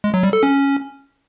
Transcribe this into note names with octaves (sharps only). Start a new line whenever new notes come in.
G#3
F#3
G3
A4
C#4